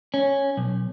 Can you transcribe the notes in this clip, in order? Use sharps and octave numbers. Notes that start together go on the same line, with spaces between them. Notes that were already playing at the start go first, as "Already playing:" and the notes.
C#4
B1